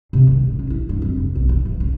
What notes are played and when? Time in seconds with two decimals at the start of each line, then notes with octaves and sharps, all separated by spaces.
0.13 C3
0.27 D#3
0.47 A1
0.59 C#4
0.70 E4
0.89 G2
1.02 F2
1.16 C3
1.36 B1
1.49 C#3
1.65 E3
1.80 C#3